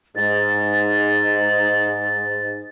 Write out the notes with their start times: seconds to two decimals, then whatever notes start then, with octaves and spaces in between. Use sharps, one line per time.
0.16 G#2 A6